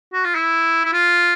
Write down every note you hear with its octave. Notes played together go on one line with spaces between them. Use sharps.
F#4
F4
E4
E4
F4